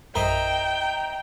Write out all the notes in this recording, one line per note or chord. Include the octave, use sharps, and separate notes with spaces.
A#1 F#2 E4 A#4 C5 D#5 G5 A#5